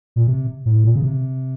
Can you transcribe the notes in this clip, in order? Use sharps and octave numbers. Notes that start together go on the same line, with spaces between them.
A#2
C3
A2
A#2
C#3
C3